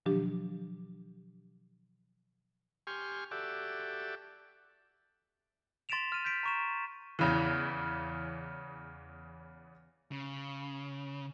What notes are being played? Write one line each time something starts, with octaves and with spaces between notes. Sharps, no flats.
B2 D#3 F3 F#3 D4 G4
G4 G#5 C6 C#6 F6
F#4 G4 A4 D5 E5
C6 A6 B6 D7 E7 F7
F6 D#7
G6 A6 B6 D7
A#5 C#6 E7
E2 C#3 E3
C#3